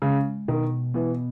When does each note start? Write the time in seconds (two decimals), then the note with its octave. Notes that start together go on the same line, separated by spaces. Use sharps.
0.02 C#3 G#3
0.48 B2 D#3
0.94 E3 B3